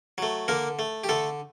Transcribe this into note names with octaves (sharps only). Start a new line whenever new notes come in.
F#3 A3
D3 A#3 A#4
A3
G4
D3 A3 A4